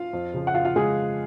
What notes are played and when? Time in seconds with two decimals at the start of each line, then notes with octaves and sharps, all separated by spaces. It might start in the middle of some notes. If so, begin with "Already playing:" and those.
Already playing: F4 F5
0.13 F2
0.34 C#3 F3
0.47 F#5
0.54 F2 F4 F5
0.65 F4 F5
0.76 C#3 G#3 G#4